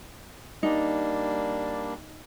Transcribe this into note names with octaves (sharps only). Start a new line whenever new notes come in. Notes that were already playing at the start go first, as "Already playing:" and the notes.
G3 A#3 D4 D#4